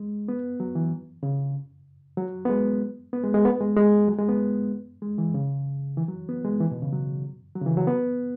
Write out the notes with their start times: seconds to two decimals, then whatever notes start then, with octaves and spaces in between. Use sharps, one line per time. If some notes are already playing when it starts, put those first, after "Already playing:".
Already playing: G#3
0.28 B3
0.60 F#3
0.75 E3
1.23 C#3
2.18 F#3
2.45 B3
2.49 G#3
3.13 B3
3.23 G#3
3.34 G#3
3.45 B3
3.61 G#3
3.76 G#3
4.08 F#3
4.18 G#3
4.29 B3
5.02 G#3
5.18 E3
5.34 C#3
5.97 E3
6.08 F#3
6.29 B3
6.45 G#3
6.61 E3
6.71 B2
6.82 C#3
6.93 F#3
7.56 F#3
7.61 C#3
7.66 E3
7.77 F#3
7.87 B3